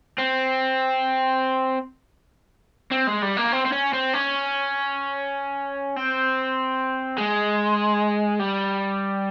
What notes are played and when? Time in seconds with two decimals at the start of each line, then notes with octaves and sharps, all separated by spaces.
0.18 C4
2.91 C4
3.07 G#3
3.22 G3
3.37 A#3
3.52 C4
3.66 C4
3.72 C#4
3.93 C4
4.14 C#4
5.96 C4
7.18 G#3
8.39 G3